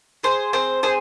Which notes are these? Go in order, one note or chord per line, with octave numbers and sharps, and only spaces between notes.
G#4 C5
C4 C5
G#4 C5